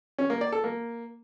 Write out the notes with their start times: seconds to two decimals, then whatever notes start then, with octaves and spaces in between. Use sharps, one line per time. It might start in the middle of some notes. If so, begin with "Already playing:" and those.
0.18 C#4
0.30 A#3
0.41 D5
0.52 A4
0.64 A#3